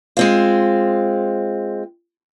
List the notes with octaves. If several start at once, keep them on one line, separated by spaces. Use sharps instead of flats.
G#3 C4 F4